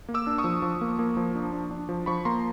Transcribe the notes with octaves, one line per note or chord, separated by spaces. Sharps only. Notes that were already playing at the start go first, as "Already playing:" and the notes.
A#3
D6 E6
D4
C#6 D#6
F3
F3
A#3
A#3
F3
D4
D4
D4
F3
F3 B5 C#6
A#3 A#5 C6